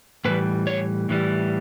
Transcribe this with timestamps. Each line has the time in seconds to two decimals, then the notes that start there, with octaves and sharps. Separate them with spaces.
0.25 A2 E3 G3 B4
0.67 C#5
1.09 A2 E3 G3